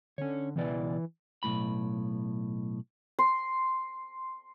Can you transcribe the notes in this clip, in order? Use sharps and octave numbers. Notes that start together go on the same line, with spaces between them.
D3 C#4 C#5
C#2 B2 E3 D5
B1 F2 A2 B5
C6